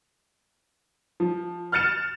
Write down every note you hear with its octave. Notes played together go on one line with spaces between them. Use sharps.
F3
F6 F#6 A6 C#7 E7